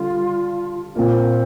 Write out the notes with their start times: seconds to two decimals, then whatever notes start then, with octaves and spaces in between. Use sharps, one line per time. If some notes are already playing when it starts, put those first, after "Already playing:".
Already playing: D3 G3 F4
0.95 A#2 A#3 C4 F4